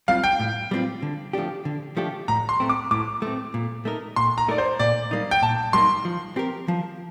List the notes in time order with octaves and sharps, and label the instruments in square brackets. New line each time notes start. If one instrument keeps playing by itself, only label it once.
[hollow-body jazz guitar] G3 C4 F4 [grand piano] F5
[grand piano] G5
[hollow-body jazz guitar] A2
G3 C4 F4
D3
F3 A3 D4 G4
D3
F3 A3 D4 G4
[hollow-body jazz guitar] A2 [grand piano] A#5
[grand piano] C6
[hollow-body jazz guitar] A3 C4
[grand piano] D6
[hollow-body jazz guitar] A2 [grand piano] D6
[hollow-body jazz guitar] A3 C4
A#2
A3 D#4 A#4
[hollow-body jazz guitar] A#2 [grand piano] C6
[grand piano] A#5
[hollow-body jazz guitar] A3 D#4 A#4 [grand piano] D5
[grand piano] C5
[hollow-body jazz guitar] A#2 [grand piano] D5
[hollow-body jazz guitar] G3 A#3 D#4
[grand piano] G5
[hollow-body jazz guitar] A#2 [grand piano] A5
[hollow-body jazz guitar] G3 A#3 D#4 [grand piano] C6
[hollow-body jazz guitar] F3
C4 G4 A#4
F3